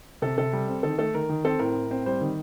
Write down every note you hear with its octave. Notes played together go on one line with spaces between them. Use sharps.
C3 A4
C3 A4
G3
C4
D#3 A4
A3 A4
D#3 A#4
D#3
C4 A4
A2 A#4
A2
C4
G3 C5
D#3